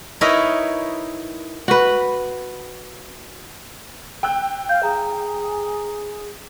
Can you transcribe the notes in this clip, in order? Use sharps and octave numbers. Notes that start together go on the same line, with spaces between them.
D#4 E4 A#4 B4 C#5 D#5
F#4 B4
G5 E6 F#6
F5 G6
G#4 A#5